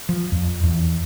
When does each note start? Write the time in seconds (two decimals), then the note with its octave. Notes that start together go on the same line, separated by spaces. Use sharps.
0.09 F3
0.32 F2
0.63 E2